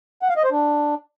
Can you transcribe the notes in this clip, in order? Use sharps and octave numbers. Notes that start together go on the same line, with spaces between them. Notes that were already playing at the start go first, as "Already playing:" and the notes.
F#5
F5
D#5
C5
D4